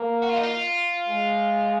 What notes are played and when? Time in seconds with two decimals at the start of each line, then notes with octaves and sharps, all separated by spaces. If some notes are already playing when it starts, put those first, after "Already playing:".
Already playing: A#3
0.22 F#4
0.29 F4
0.36 D#4
0.43 F4
1.08 G#3